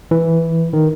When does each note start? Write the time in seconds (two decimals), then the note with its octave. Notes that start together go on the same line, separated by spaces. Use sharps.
0.11 E3
0.73 D#3